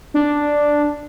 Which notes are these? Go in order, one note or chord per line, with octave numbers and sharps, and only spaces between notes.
D4